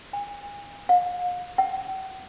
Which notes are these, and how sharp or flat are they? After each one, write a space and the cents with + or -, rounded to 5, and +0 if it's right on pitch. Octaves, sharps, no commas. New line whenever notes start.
G#5 -35
F5 +40
G5 -45